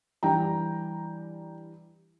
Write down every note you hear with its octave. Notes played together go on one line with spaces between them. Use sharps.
E3 G3 D4 G5 A#5